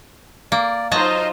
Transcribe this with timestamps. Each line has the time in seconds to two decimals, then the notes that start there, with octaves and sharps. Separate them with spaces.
0.52 A#3 D5
0.91 F#3 D#4 F4 C5 D#5 A5 A#5